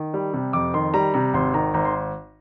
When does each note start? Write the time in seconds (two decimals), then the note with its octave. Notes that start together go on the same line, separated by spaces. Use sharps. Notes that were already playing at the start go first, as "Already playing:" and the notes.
Already playing: D#3
0.14 G3
0.33 C3
0.53 F2 D6
0.74 D#3 C6
0.94 G3 A#5
1.14 C3 A#5
1.34 G#1 C6
1.54 D#3 A#5
1.74 G#1 A#5
1.85 C6